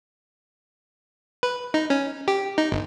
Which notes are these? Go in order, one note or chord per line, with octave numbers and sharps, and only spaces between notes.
B4
D#4
C#4
G4
D#4
G1